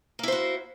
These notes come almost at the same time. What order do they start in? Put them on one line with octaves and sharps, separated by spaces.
A#3 E4 C5 F#4